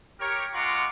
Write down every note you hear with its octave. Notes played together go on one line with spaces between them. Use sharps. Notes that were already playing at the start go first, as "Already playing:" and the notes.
G4 A#4 C#5
G#3 F4 F#5 A#5 C#6 D6